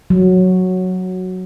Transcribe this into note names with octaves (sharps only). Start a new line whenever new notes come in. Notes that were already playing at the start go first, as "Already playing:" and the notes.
F#3